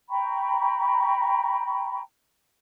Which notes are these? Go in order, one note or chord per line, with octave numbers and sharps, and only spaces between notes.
G5 A#5 B5 C#6